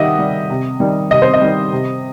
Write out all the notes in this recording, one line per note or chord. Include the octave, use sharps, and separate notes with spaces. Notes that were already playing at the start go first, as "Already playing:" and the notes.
Already playing: D#3 G3 G4 D#5 E5 F#5
G3
C3
D#3 G3
C3 D#5
C5
D#5
D#3 G3
C3